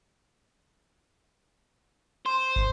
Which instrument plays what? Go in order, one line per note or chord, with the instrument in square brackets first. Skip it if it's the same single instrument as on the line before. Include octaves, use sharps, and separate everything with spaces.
[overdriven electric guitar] C5
[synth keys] G#1